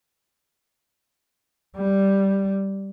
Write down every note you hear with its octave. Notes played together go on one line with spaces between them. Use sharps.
G3